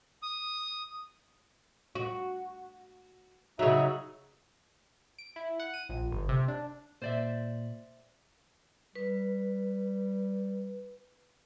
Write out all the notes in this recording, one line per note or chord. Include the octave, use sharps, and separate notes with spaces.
D#6
F#4
C#3 F#3 D#4 E5
D7
E4
F#5
D#7
A#1
G1
C3
D4
A#2 C5 D5 E5
G3 B4